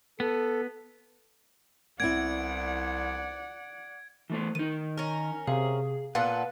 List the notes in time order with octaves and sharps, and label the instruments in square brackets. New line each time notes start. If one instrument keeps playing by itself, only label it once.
[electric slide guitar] B3 [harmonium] A4
[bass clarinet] C2 [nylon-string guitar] B3 C4 E4 [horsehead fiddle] D5 F#5 [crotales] G#6 D7
[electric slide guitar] E3 A3 C5
[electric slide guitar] D#3 D#4 [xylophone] D#7
[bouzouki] C#4 A#4
[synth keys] C3 [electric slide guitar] G#4 [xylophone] F5
[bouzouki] A#2 B3 A4 [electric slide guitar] B4 [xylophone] F5 [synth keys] F#5